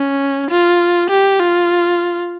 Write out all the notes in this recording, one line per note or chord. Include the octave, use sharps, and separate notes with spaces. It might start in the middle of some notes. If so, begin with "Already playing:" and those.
Already playing: C#4
F4
G4
F4